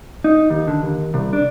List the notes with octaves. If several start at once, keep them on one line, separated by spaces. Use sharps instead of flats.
D#4
D#2
D3
D#2
C2
D4